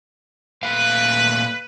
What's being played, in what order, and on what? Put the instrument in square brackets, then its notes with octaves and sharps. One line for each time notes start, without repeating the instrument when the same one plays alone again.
[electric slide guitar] A#2 A3 F5 [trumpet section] B4